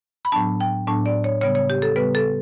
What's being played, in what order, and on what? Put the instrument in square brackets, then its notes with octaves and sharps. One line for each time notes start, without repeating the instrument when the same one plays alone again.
[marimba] B5
A2 F#3 B3 D4 A5
G5
A2 F#3 B3 D4 A5
D5
C#5
C#3 G3 B3 C#5
C#5
G4
A4
C#3 G3 B3 B4
A4